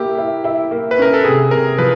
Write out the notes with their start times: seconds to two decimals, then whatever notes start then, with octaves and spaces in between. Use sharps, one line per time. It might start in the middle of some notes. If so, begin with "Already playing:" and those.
Already playing: A#3 E4 G4
0.18 E4
0.44 E4
0.71 A#3
0.91 B4
0.98 C#4 A#4
1.14 A4
1.24 C3 G#4
1.51 C3 A#4
1.78 F3 B4